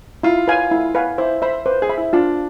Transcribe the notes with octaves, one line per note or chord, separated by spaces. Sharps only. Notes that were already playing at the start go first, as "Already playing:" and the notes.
E4 F4
B4 F5 G#5
E4
B4 F5 G#5
E4 C5
C5 E5 B5
B4 C5
G#4
E5 B5
E4
D4 F4